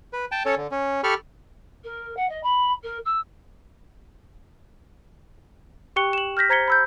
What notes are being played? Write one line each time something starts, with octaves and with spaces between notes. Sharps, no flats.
B4
G5 A5
C#4 A4 C#5
D3
C#4
G4 A4 B5 C#6 F6
A#4
F#5
D#5
B5
A#4
E6
G4 G5 C#6 F#6 C#7 G7
E7 F#7
F6 G6 A#6 B6
C5 A#5 G#6 B6 C#7 G7
B5 E6 G6